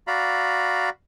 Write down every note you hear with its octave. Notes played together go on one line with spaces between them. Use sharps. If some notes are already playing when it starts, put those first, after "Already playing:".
F#4 D5 F5 A#5 B5